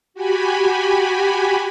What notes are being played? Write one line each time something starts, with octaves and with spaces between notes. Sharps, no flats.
F#4 G4 G#5 B5